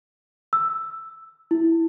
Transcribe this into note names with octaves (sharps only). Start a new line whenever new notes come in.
E6
E4